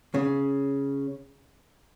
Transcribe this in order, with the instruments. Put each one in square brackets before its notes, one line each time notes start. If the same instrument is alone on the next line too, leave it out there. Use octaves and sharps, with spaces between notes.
[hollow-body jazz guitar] C#3